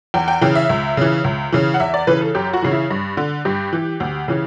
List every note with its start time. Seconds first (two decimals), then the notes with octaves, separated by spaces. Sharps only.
0.14 E2 G5
0.28 G5
0.41 C#3 E3 G5
0.55 E5
0.69 C#2
0.97 C#3 E3
1.24 C#2
1.52 C#3 E3
1.74 F#5
1.80 E2 E5
1.94 D5
2.07 C#3 E3 B4
2.21 A4
2.35 F#2 G4
2.53 F#4
2.62 C#3 E3
2.71 E4
2.90 G2
3.17 D3
3.45 G2 G4
3.73 E3
4.00 D2
4.28 C#3 E3